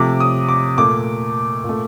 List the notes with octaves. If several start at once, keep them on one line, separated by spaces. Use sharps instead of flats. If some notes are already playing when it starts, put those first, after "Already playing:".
Already playing: C3 F3 A3 D6
D#6
D6
A#2 A3 D6
A#2
A3